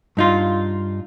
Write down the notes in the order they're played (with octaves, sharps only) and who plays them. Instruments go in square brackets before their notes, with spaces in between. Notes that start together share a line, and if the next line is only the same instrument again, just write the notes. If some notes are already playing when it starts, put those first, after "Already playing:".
[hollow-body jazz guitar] G2 D#4 F4